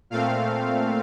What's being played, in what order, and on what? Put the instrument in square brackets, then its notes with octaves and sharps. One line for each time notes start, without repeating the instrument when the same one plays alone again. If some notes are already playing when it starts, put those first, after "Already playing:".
[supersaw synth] A#2 A3 C4 F5